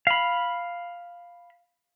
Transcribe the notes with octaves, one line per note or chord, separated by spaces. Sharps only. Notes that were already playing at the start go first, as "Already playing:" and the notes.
F5 B5